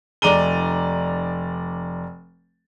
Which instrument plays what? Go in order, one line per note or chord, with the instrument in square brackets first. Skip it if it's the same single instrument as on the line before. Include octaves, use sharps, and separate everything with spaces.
[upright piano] F1 D5 A#5 D#7 G7